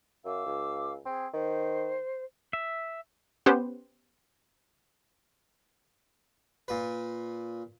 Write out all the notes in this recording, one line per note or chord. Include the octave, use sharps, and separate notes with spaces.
F#2 F5 D6 E6
C#2
C4 G#4
D#3 C5
E5
B3 C#4 G4 B4 C5
A#2 B4